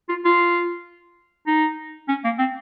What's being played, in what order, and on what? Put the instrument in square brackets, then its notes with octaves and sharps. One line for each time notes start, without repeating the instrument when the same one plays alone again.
[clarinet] F4
F4
D#4
C#4
A#3
C4